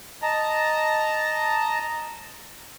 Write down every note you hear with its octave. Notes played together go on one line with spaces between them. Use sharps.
D#5 A5 A#5